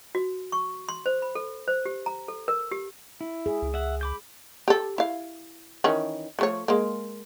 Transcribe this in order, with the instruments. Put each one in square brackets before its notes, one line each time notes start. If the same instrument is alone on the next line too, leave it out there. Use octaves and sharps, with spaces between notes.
[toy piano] F#4
C#6
C6
C5
B5
A4
C5
G4
A#5
A4
A#4
G4
[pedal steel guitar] E4
[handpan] G#4
[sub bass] C#2
[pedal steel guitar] E5 F#5
B5 D6 G6
[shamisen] G4 A4
E4 F5
D#3 E3 C#4
F3 A3 C#5
G#3 A#3